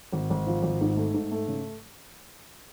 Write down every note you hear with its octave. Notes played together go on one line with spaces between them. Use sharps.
G#1
G#1
F3
G#1
G#2
A3
G#2
A3
C#3